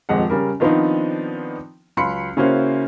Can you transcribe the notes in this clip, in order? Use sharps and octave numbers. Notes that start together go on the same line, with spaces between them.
D#1 F2 G#3 F#5
C#3 G3 A#4
D#3 F3 B3 C4 D4 D#4
C#2 F#3 B5 C6 C#7
C#3 A#3 C#4 E4 F#4 C5